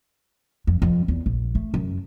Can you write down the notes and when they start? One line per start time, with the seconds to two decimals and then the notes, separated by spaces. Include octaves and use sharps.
0.67 F2
0.82 F2
1.08 E2
1.26 A#1
1.55 A3
1.74 F#2